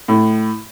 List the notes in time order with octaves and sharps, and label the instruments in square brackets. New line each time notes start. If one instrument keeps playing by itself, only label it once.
[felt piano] A2